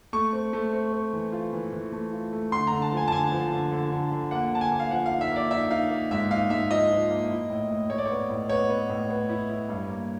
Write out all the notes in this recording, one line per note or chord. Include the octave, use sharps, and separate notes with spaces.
A3 C#6
C4
A3
C4
C4
E3
F4
E3
E3
A3
F4
A3
D3 C6
D3 A#5
A5
F3 G#5
A5
D3 G#5
F3
D3
D3
D3
D3
A#3 F#5
D3 A5
G#5
A#3
F5
F3 F#5
F5
D#4
E5
A#3 D5
D#4 E5
D#4 F5
A#3
G#2 E5
D#4 F5
G#2 E5
F3 D#5
F3
A#3
E4
A2
A2
A2 C#5
D5
B3 C#5
A2
B3 C#5
B3
A2
B3
E4
E4
G2
A#3